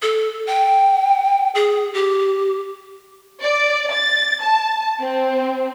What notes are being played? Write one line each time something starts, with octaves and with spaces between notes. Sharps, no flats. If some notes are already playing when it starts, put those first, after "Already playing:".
A4
G5
G#4
G4
D5
A6
A5
C4